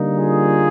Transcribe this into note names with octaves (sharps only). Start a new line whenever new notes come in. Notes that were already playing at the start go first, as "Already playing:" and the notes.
Already playing: D3 G3 A#3 D#4
F4 G#4